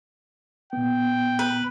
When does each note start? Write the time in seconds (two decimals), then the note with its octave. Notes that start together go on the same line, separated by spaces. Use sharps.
0.73 A#2 B3 G5
1.39 B4